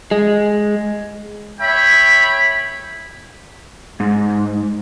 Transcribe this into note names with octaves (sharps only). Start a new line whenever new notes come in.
G#3
C#5 E5 G5 B5
G#2